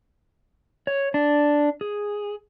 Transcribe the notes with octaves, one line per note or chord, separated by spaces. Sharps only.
C#5
D4
G#4